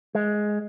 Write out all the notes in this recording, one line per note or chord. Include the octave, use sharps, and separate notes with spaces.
G#3